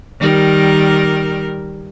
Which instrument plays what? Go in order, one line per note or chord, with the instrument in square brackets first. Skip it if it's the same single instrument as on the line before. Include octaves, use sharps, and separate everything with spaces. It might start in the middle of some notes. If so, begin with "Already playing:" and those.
[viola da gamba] D#3 G3 A#4